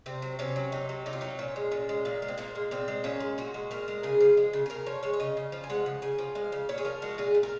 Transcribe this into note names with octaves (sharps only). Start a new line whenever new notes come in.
C3 C4
F#3
C3 C#4
F#3
C3 D#4
F#3
C3 D#4
F4
F#3 D#4
A#2 C#4
G#3
A#2
G#3
A#2 A#3
G#3
C4
A#2 A#3
G#3
A#2 C4
G#3
A#2 C#4
G#3
A#2 F#4
G#3
A#2 A#4
G#3
C#3 G#4
F3
G#3
C#3
G#4
C#3 A#4
F3 C#5
G#3 C#5
C#5
C#3 D#5
C#3
F3
G#5
G#3 F#5
C#3
C#3 G#5
F3
G#3 F5
C#3
A#2 C#5
G#4
F3 A#4
G#3 F#4
A#2 G#4
A#2
A#4